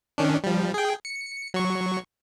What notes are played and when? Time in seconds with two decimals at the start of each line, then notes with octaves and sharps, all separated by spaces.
0.18 D#3 C#4 D4
0.44 F3 G3
0.74 G#4 G5
1.05 C#7
1.54 F#3 C#6